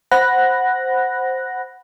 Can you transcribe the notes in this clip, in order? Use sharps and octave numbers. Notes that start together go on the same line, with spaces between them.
C5 F#5 B5 F#6 A#6